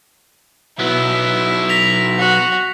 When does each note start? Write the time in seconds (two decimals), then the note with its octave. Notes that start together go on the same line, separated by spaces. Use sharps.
0.79 F#3 B3 E4
1.69 A#6 B6 F7
2.18 F#4